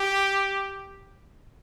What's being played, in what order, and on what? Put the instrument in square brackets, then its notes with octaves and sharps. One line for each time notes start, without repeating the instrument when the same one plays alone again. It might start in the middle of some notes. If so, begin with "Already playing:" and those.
Already playing: [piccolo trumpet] G4